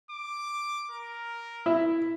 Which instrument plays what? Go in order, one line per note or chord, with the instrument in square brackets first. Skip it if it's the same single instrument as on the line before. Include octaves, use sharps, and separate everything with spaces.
[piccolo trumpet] D6
A#4
[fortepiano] E4